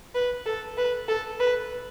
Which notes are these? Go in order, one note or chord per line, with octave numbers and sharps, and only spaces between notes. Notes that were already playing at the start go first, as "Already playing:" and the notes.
B4
A4
B4
A4
B4